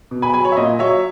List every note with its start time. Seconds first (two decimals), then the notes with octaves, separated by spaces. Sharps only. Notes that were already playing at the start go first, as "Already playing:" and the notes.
0.11 B2
0.22 G#5 B5
0.33 F#3 G#5 B5
0.45 C#5
0.52 E5
0.57 A#2 D#5
0.79 F#3 C#5 E5